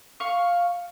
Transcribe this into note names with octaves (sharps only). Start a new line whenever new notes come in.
F5 C#6